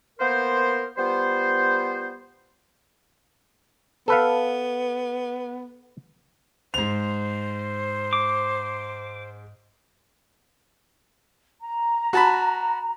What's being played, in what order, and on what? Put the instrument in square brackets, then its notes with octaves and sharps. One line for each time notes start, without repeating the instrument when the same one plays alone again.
[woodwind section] A#3 B3 A#4 C5
G3 B3 F4 C5
[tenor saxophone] B3 [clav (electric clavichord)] A4 B4 F5
[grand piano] G#2 F7 [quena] C5
[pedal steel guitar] D6
[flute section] A#5
[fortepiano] F#4 A5 B5